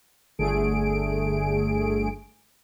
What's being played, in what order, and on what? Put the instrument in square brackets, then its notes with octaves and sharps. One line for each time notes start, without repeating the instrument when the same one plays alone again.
[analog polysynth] G1 D3 A3 G#4 D7